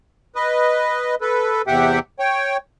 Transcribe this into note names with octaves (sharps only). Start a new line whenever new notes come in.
B4 D#5
A4 B4
E2 C3 G4 E5 F#5 G5
C#5 G5